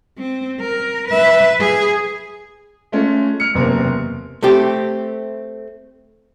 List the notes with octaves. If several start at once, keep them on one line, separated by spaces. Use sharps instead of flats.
C4
A#4
B4 E5
G#4
G#3 A3 C#4 F4
F6 C#7
F#1 E2 C3 A#3 A#4
A3 C4 G4